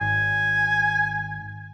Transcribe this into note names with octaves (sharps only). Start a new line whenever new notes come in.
G#1 G#5